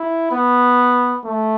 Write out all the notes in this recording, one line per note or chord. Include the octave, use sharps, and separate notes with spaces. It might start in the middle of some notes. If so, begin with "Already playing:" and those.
Already playing: E4
B3
A3